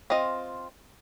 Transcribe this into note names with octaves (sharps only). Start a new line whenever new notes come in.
C4 F4 D#5